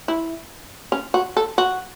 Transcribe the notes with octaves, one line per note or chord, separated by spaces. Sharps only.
E4
C#4
F#4
A4
F#4